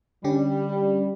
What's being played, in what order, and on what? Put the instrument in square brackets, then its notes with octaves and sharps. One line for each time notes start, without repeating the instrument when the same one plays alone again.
[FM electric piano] D3 C#4 G4 [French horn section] G3